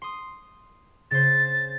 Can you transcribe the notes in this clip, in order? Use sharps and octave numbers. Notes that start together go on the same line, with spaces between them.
C6 D#6
C#3 C5 A6